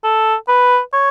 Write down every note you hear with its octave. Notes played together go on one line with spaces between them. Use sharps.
A4
B4
C#5